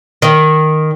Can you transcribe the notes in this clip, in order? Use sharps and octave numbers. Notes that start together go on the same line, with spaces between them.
D#3